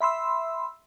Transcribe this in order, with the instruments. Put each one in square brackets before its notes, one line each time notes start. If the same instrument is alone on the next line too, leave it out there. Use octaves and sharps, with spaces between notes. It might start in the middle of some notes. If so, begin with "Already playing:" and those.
[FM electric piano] E5 B5 C6 E6